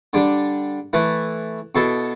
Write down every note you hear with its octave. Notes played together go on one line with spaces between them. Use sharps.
D3 G3 D4
E3 A3 E4 B4
B2 B3 E4 A4